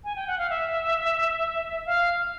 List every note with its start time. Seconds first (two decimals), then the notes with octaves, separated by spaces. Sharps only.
0.04 G#5
0.16 G5
0.27 F#5
0.38 F5
0.50 E5
1.86 F5